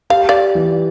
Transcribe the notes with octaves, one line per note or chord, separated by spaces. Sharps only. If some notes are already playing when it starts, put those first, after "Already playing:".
G4 F5
D5 F5
E3